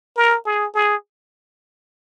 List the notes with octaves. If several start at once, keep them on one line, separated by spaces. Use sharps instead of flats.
A#4
G#4
G#4